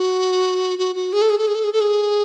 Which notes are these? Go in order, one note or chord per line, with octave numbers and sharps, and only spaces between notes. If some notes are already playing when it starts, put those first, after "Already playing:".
Already playing: F#4
F#4
F#4
G#4
A4
G#4
A4
G#4
A4
G#4
A4
G#4